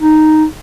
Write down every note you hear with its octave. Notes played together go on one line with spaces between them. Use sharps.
D#4